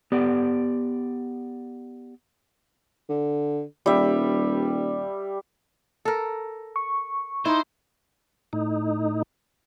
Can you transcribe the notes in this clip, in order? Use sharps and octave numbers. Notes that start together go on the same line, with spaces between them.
B3 G4 D5
D3
D#1 G3 E5
A4 A#4
C#6
D#4 E4 C5
A2 D#4